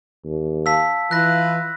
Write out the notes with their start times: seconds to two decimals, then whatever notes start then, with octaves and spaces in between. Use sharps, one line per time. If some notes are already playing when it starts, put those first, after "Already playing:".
0.25 D#2
0.66 F5 A5 E6 B6
1.11 E3 E4 F4 B4 F#6 A#6